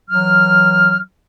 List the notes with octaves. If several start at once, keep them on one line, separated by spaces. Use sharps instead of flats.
E3 F#3 F6